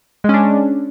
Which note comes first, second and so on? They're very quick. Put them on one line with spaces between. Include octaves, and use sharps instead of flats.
G#3 C#4 D4